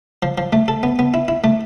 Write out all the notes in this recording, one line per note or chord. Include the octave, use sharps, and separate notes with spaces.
F3
F3
A3
A4
B3
B3
E4
E4
A3